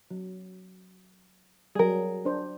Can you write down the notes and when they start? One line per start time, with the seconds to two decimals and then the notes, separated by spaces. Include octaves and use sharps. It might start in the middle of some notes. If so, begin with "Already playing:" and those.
0.11 F#3
1.75 F#3 G3 G#4 A#4
2.25 D4 C5